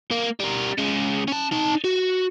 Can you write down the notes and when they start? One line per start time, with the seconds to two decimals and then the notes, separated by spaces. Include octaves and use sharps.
0.11 A#3
0.40 G3 A#4
0.78 C#3 G#3
1.28 C#4 A5
1.52 D#4 A5
1.84 F#4